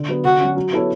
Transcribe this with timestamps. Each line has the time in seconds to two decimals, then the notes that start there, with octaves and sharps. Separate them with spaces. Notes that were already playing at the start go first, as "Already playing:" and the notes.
Already playing: D3
0.08 F#3 B3
0.25 D3 F#4
0.40 F#3 C#4
0.56 F#3
0.73 B3 E4 A4 C#5